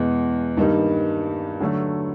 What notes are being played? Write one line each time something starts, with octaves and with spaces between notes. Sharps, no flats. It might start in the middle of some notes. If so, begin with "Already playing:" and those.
Already playing: E2 B2 G#3 B3
G2 D#3 G3 A#3 D#4
D3 F#3 A3